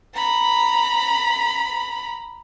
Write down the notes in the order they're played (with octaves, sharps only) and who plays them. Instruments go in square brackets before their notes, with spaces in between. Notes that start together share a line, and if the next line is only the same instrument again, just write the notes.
[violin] A#5 B5